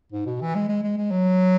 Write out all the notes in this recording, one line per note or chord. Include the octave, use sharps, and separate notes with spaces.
G#2
B2
E3
G#3
G#3
G#3
G#3
F#3